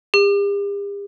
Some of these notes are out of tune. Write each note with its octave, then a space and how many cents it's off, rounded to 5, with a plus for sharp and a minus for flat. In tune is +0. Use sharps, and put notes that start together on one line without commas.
G4 +45